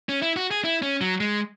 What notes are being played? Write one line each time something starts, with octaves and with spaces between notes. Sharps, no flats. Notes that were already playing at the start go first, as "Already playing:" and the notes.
C#4
E4
F#4
G#4
E4
C#4
F#3
G#3